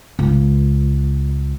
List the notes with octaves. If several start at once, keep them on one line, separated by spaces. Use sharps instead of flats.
C#2